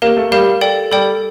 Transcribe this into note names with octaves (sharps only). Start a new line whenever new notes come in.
A#3 G4 A#4 F5
A3
G3 G4 A#4 F5
A4 D5 G5
G3 A4 D5 G5